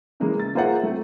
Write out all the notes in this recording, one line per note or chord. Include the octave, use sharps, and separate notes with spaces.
C#3 E3 G#3 A#3
A6
A#3 F4 G#4 C5 E5 F#5
A3 C4